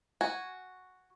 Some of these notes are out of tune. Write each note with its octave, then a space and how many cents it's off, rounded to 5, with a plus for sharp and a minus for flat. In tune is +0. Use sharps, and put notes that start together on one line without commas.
F#4 +0 G#5 +0